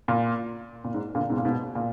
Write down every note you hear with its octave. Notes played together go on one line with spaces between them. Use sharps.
A#2
A#2
G#2
A#2 D3
G#2 B2
A#2
G#2 B2
A#2